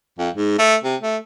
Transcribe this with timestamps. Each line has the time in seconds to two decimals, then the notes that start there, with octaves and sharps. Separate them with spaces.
0.19 F2
0.35 G#2
0.59 A3
0.84 C3
1.01 A3